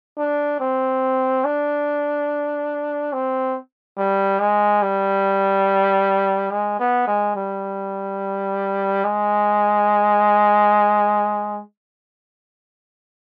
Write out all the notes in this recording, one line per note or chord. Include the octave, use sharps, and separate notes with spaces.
D4
C4
D4
C4
G3
G#3
G3
G#3
B3
G#3
G3
G#3